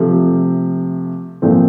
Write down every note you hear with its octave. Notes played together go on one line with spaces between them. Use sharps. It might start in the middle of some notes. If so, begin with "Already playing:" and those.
Already playing: C3 F3 A3
A#2 F3 A3 C4